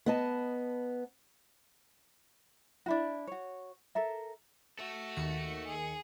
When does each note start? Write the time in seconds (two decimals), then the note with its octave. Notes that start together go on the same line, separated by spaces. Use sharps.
0.06 B3 D#5 A5
2.86 D4 E4 F#4
3.27 F#4 C#5
3.95 A4 A#4 E5
4.79 F#4 A4 E5
5.17 D#2 D#3 C#7
5.68 G#4